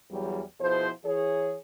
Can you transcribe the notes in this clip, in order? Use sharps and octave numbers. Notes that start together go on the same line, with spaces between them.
E2 F#3 G3
B2 F3 E4 G#4 C5
E3 G#4 C#5